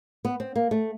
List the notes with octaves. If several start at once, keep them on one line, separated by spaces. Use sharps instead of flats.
B3
C4
A#3
A3